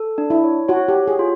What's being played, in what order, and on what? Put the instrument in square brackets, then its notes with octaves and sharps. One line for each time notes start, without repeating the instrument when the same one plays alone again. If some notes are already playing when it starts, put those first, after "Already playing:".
Already playing: [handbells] A4
D4
[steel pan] E4
[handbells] C#5
[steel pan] F#4 [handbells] C#5
[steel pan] G4
[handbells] C#5
[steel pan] G#4
[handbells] F4